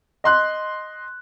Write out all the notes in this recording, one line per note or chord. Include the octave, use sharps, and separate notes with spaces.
D#5 C6 F#6